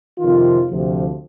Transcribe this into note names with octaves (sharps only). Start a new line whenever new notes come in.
F2 C3 D#3 F4
D2 C3 F3